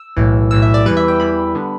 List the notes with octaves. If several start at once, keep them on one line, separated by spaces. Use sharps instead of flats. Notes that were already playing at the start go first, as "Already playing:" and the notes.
Already playing: E6
B1 A2 E3
B1 A2 E3 E6
E5
D5
E2 E3 G3 B4
E5
G5
E2 E3 G3 B5
D3 G3 B3